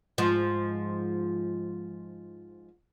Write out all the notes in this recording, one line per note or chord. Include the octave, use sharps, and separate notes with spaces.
G#2 F3